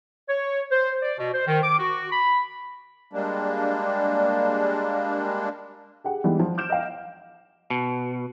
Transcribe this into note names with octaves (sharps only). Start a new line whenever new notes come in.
C#5
C5
D5
B2
C5
D#3
D6
F#4
B5
G3 G#3 A#3 D4
G4 G#4 F#5
E3 G3 G#3 B3 D#4
F3
D6 F6 G6 D7 E7
D#5 F5
B2